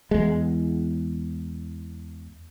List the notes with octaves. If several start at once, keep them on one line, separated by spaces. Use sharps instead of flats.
E2 G#3